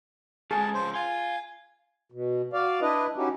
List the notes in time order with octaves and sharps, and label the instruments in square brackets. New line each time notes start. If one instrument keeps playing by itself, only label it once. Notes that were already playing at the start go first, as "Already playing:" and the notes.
[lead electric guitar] D3 G#3 [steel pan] G#4 [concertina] A5
[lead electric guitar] C#3 F3 [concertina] C5
[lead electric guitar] F5 C6 [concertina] G#5
[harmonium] B2
F#4 D5 F5
D4 E4 B4 D#5
C#4 D#4 E4 F#4 G4